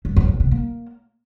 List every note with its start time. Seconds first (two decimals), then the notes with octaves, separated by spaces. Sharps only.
0.05 G2
0.16 F2
0.28 G#2
0.40 C3
0.51 A#3